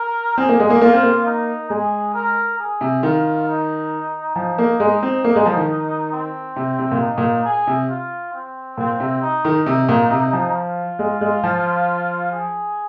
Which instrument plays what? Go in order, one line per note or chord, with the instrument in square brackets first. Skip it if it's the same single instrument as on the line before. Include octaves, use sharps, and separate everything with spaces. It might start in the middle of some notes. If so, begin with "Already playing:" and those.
Already playing: [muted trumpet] A#4
[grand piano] C4 [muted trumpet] G#4
[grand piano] A#3
G#3
A#3
[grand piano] A#3 [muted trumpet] F4
[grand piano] C4
A#3
[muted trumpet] D#4
[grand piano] G#3 [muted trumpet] G#4
[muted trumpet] A#4
G#4
[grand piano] C3
[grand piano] D#3 [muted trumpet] F4
[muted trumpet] D#4
[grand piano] F3 [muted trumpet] D#4
[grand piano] A#3
G#3
C4
A#3
G#3
F3
D#3
[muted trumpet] C4
[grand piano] C3
C3
A#2
[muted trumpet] D#4
[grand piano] A#2
[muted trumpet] G#4
[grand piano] C3
[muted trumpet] F4
C4
[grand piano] A#2 [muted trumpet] C4
[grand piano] C3
[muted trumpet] D#4
[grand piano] D#3
C3
A#2
C3
F3
[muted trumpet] F4
[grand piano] G#3
G#3
F3
[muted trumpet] G#4